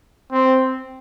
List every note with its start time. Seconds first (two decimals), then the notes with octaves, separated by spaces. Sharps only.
0.32 C4